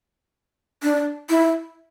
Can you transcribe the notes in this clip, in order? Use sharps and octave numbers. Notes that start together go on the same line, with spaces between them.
D4
E4